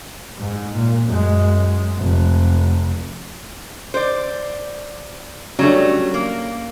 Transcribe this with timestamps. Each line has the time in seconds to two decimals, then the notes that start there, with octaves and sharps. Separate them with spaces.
0.38 G#2
0.74 A#2
1.05 F#2 G#3
1.98 F1
3.94 C5 D5
5.59 F#3 G3 A3 C#4 D4
6.14 A#3